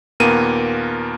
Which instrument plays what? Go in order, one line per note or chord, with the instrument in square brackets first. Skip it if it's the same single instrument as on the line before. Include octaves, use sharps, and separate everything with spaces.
[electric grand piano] D#2 A#2 A#3 B3 D#7